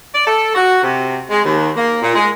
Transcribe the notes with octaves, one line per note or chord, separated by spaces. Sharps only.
D5
A4
F#4
C3
G#3
D#2
A#3
A#2
G#3